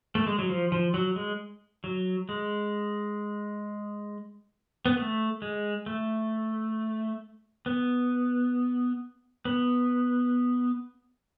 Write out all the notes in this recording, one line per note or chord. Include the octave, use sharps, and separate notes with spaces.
A3
G#3
F#3
F3
F3
F#3
G#3
F#3
G#3
B3
A3
G#3
A3
B3
B3